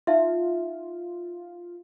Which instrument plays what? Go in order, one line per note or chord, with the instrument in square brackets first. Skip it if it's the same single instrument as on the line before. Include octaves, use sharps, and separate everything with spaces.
[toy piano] D#4 E5 [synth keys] F4